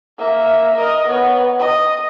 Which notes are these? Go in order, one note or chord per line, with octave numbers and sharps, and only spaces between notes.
A#3 E5
A#4 D#5
B3 C#5
D#5